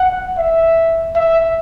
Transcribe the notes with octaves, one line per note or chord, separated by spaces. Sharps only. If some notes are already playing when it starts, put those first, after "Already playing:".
Already playing: F#5
E5
E5